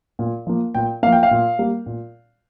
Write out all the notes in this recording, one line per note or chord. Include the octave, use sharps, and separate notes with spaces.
A#2
F3 A#3
A#2 G5
F3 A#3 F5
G5
F5
A#2
G3 A#3
A#2